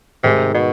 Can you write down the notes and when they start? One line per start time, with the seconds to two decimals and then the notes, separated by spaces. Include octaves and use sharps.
0.23 G#2 C3 D#3 G#3
0.54 B2